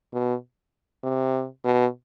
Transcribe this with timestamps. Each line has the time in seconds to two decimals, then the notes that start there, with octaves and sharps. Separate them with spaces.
0.13 B2
1.04 C3
1.65 B2